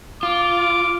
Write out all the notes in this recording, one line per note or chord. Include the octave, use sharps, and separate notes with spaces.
F4 D6